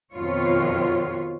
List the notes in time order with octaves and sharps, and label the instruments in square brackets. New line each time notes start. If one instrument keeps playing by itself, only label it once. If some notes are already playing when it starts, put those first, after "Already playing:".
[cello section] F2 B2 D#3 F4 C#5